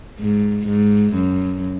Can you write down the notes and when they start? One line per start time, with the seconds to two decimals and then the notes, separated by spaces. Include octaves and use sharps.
0.20 G#2
0.67 G#2
1.14 F#2